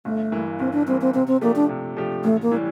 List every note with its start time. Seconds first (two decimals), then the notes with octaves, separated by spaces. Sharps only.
0.05 G1 A3
0.32 G2 E3 A#3
0.59 G1 C4
0.73 D4
0.87 G2 E3 A#3 C4
1.01 C4
1.14 C3 C4
1.28 C4
1.42 F3 A3 A#3 D4 G4
1.56 D4
1.69 C3
1.97 F3 A3 D4 G4
2.24 A1 A3
2.42 A#3
2.51 A2 E3 G3